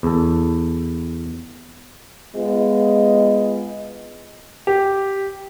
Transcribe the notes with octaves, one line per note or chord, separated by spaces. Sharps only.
E2 A4
G#3 B3 F4 D#5
G4